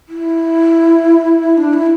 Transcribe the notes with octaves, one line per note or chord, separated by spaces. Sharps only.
E4
D4
E4